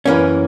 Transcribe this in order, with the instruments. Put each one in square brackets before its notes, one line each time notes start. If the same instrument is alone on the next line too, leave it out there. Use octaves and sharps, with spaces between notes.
[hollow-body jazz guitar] F#2 E3 A#3 C#4